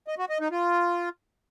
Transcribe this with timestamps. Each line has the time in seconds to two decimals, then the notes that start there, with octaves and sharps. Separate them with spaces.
0.08 D#5
0.19 F#4
0.29 D#5
0.40 D#4
0.51 F4